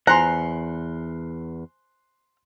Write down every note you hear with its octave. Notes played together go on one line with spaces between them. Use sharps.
E2 C5 G#5 A#5 C6 F#6